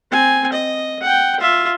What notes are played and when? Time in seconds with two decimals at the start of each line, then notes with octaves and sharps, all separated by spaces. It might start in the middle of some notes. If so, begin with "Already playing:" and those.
0.11 C4 G#5
0.53 D#5
1.02 F#5 G5
1.40 F4 E5